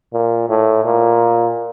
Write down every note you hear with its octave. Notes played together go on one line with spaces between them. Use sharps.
A#2
A2
A#2